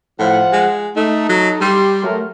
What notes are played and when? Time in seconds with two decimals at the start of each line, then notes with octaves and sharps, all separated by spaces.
0.19 A2 F3 F4 F#5
0.53 G#3
0.96 A3 D#4 A4
1.29 F#3
1.61 G3 G4 C6
2.03 F#3 A3 A#4